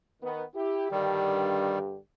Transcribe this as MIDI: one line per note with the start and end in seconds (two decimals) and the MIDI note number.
0.22 0.43 51
0.22 0.43 59
0.55 0.91 64
0.55 0.91 67
0.91 1.97 43
0.91 1.97 50
0.91 1.79 51
0.91 1.79 55
0.91 1.97 67